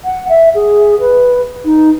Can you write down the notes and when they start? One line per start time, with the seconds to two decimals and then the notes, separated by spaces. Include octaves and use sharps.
0.04 F#5
0.29 E5
0.55 G#4
1.00 B4
1.65 D#4